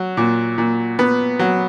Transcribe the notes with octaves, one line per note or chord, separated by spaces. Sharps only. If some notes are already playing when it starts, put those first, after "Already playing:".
Already playing: F#3
A#2
A#2
B3
F#3